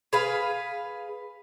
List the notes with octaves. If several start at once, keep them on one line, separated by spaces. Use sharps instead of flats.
G#4 B4 F5